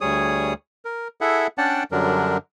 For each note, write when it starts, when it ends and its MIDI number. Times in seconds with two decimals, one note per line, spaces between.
0.01 0.53 38
0.01 0.53 55
0.01 0.53 68
0.01 0.53 73
0.01 0.53 87
0.85 1.08 70
1.21 1.47 64
1.21 1.47 68
1.21 1.47 69
1.21 1.47 76
1.21 1.47 78
1.58 1.84 61
1.58 1.84 62
1.58 1.84 74
1.58 1.84 78
1.58 1.84 79
1.58 1.84 81
1.92 2.37 42
1.92 2.37 50
1.92 2.37 54
1.92 2.37 55
1.92 2.37 62
1.92 2.37 70